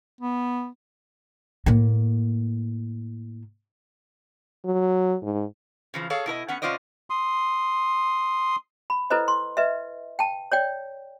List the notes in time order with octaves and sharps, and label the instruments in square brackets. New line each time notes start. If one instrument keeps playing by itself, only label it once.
[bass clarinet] B3
[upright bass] A2 A#3
[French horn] F#3
G#2
[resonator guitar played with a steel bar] C#3 E3 F3
G#4 A4 C#5 F5
B2 E4 A#4 D#5
B3 C#4 F#5
C3 C#4 F4 C5 D5 D#5
[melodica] C6 D#6
[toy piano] B5
E4 A4 B4 C5 D#5
C6
B4 D#5 E5
G5 A5
C#5 D5 G5